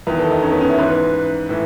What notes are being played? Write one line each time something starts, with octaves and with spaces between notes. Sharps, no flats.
E2 D#3 B4
A4
D#4
C#4
B3
C#4
E4
G#2 E3 B4
A2 E3